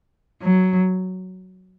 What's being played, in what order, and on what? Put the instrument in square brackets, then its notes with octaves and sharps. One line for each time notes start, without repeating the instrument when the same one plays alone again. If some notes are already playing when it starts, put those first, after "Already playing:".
[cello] F#3